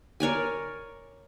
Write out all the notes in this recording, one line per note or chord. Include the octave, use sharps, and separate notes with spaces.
A#4 C#5 D5 G#5